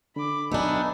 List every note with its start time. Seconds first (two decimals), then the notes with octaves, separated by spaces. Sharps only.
0.16 D3 B5 D6
0.52 B1 B3 D4 D#4 E5 G#5 B5